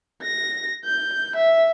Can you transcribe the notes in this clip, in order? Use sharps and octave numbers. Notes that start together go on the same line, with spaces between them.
A#6
G6
E5